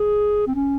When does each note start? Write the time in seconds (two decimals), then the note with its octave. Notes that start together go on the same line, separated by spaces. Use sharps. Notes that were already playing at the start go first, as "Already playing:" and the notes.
Already playing: G#4
0.47 C4
0.55 C#4